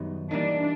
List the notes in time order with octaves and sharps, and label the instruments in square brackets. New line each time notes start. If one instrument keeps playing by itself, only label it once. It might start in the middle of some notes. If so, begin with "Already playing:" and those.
Already playing: [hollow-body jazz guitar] F#2 D#3 G3 B3 D#4
[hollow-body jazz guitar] E3 G3 A#3 D#4 [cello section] D4